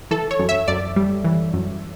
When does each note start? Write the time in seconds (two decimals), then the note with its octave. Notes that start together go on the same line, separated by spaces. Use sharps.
0.11 E3 A4
0.31 C#5
0.39 F#2
0.49 E5
0.68 F#2 D5
0.96 G3
1.24 E3
1.54 F#2